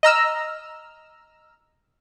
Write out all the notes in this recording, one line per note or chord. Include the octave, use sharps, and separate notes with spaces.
D#5 A#5 E6 F6